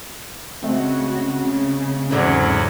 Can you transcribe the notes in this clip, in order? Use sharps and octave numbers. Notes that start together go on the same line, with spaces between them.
C#3 G#3 A3 C4 F#4
C#3
E2 G#2 D3 E3 F#3